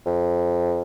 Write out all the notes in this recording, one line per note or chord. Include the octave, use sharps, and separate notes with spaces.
F2